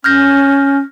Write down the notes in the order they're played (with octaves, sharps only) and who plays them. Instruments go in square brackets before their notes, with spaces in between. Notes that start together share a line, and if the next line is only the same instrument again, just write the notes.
[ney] C#4 [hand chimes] F6 G6 A#6